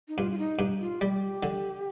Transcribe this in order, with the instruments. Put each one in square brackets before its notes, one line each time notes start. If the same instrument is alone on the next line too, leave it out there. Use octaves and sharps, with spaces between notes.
[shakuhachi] D#4
[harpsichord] G2 [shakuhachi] F4
[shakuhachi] F4
D#4
[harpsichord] G2
[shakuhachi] F4
[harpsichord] G3 [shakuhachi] G4
[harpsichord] D3